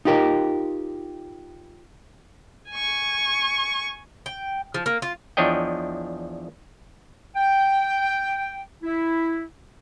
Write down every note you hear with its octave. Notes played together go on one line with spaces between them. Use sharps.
D#4 F4 G4 A#4
G#5 C#6
G5
F3
A#3
F4
E2 F3 D4 C#5 D#5 G5
G5
E4